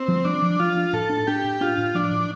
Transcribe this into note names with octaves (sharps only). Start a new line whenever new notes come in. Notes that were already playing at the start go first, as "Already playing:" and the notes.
Already playing: C4
F3
F3 D4
F3
F3 F4
D4
A2 A4
D4
D4 G4
A2
D4 F4
A2
F3 D4
A2